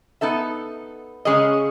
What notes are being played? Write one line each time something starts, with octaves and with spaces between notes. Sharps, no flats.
B3 D#4 A4 E5
C#3 G#3 C#4 G#4 D#5